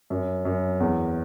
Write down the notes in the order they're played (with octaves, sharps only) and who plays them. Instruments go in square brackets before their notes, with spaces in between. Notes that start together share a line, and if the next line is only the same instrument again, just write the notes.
[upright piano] F#2
F#2
E2